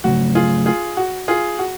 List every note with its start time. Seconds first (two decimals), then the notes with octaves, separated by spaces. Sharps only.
0.04 C#3 F#3 A3 F#4
0.35 F4 G#4
0.66 F4 G#4
0.97 F#4
1.28 F4 G#4
1.59 F#4